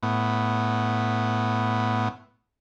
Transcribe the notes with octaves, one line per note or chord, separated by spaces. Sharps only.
A2 B3